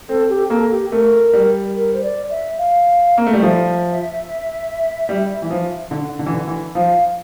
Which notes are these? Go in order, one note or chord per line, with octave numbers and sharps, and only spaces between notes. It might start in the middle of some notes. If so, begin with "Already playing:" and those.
C4 A4
G4
A#3 A4
G4
A3 A#4
G3
A#4
C5
D5
E5
F5
A#3
A3
G3
F3 E5
G3
E3
F3
D3
D3
E3
D3
E3
F3 F5